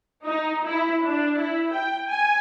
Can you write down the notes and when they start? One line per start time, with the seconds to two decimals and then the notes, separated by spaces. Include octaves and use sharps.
0.23 D#4
0.65 E4
1.03 D4
1.37 E4
1.73 G5
2.10 G#5